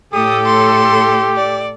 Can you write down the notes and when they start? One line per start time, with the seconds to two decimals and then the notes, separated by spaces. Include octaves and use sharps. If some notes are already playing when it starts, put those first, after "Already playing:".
0.14 A2 G4 A4 D#6
0.46 C6
1.36 D5